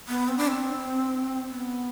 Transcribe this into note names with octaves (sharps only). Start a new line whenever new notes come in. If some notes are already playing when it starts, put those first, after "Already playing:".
B3
C4
D4
C4
B3